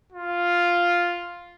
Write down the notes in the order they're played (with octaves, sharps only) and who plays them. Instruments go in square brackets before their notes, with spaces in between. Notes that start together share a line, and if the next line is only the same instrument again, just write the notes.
[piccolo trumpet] F4